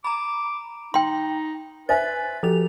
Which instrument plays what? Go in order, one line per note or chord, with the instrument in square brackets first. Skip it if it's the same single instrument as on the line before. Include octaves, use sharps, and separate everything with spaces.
[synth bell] A#5 B5 [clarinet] D6
[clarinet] D#4 [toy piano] G5 C6
[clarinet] B4 [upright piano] C5 E5 G#5 [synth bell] A6
[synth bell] F3 F7 [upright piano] F#4 G4 A4